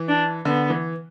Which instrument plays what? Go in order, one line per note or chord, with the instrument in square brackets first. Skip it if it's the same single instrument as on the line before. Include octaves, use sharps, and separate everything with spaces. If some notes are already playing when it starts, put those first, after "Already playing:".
Already playing: [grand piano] E3
[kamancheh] D4
[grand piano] D3 [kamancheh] B3
[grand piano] E3